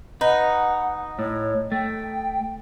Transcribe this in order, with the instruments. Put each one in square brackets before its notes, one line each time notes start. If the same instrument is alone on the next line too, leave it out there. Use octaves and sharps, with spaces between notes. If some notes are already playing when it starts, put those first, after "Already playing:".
[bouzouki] D#4 [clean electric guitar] B4 [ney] F#5
[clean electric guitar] A2 [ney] C#5
[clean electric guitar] A3 [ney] G5